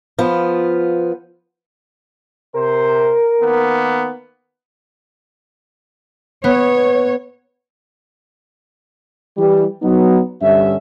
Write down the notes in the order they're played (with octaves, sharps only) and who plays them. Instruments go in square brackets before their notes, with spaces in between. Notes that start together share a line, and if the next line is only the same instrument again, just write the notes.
[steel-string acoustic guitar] F3 B3 F4
[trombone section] C3 C5 [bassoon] A#4
[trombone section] D#3 A#3 B3
[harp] B3 [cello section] C#5
[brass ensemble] E3 G3
F#3 B3 D#4
G2 D3 C#4 E5